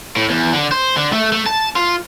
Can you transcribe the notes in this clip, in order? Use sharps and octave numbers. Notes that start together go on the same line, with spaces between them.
A2
E2
D3
C5
D3
A3
A3
A5
F4